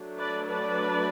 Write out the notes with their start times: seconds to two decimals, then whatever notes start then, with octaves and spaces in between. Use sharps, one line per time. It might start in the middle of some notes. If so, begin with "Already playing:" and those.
Already playing: F#3 A3 D4
0.18 B4 D5
0.46 B4 D5